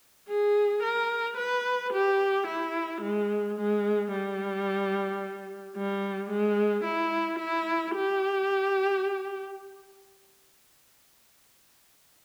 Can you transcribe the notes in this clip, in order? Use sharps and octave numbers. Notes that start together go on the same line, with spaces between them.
G#4
A#4
B4
G4
E4
G#3
G#3
G3
G3
G#3
E4
E4
G4